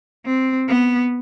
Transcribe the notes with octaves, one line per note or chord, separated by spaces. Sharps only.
C4
B3